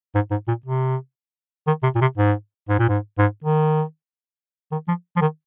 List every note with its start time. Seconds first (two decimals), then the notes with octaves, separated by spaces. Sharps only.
0.15 G#2
0.31 G#2
0.48 A#2
0.66 C3
1.67 D#3
1.83 C3
1.95 A#2
2.01 C3
2.17 G#2
2.69 G#2
2.79 A#2
2.89 G#2
3.18 G#2
3.44 D#3
4.72 D#3
4.88 F3
5.16 F3
5.22 D#3